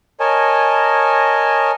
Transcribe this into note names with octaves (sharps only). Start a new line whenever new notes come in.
A#4 C#5 D#5 G#5 A5